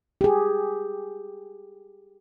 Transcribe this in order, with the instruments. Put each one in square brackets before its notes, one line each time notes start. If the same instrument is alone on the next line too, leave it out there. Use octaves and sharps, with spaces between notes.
[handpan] G4 G#4